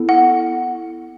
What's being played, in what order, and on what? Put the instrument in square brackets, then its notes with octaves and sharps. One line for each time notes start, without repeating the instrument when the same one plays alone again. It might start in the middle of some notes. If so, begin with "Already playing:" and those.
Already playing: [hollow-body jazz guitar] B3 E4 A4
[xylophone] F#5